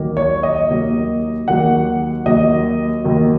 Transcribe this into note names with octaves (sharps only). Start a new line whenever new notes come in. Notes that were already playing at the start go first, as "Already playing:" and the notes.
Already playing: D#2 D#3 F#3 A#3
C#5
D#5
D#2 D#3 F#3 A#3
D#2 D#3 F#3 A#3 F#5
D#2 D#3 F#3 A#3 D#5
D#2 D#3 F#3 A#3